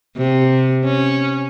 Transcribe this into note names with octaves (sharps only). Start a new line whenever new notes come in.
C3
C#4